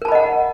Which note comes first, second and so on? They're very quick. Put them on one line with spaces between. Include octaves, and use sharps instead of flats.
A#4 A5 B5 D#5 F#5